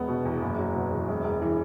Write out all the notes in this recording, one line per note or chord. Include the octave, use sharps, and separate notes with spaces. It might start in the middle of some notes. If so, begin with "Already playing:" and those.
Already playing: E1 B3
B2
E2
F#1
F#3
B2
E2
E1
E1
E3